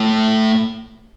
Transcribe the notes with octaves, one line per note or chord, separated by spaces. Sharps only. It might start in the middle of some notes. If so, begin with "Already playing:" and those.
Already playing: A2